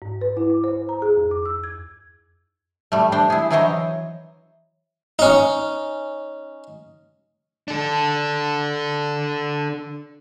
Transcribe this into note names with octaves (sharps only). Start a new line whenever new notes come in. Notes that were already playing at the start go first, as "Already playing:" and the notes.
G#2
B4
E4
D6
C5
A#5
G#4
F2
D6
E6
G#6
G3 A3
D4 C5 G5
E4 G#4
E3 F#3 E4 C5 C#5 D#5
C#4 D#4
D4 A4